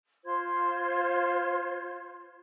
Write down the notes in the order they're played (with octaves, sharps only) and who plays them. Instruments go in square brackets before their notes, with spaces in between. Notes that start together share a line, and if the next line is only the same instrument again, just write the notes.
[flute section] F4 C5 C6 G#6